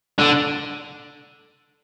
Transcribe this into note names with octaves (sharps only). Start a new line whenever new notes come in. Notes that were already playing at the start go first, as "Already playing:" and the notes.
D3